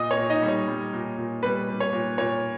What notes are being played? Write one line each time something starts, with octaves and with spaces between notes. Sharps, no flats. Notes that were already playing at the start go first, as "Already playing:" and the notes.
Already playing: A#2 D#5 D#6
C#5 C#6
A#2
D#4 D#5
G3
C#5
G3
A#2
A#2
G3 B4
G3
C#5
A#2
A#2 C#5